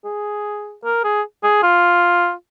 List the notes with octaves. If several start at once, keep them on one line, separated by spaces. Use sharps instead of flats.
G#4
A#4
G#4
G#4
F4